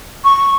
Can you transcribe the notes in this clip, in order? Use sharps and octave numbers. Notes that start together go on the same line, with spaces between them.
C#6